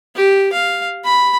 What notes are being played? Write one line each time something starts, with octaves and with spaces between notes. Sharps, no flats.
G4
F5
B5